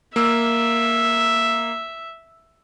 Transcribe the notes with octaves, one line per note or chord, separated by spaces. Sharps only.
A#3 E5 E6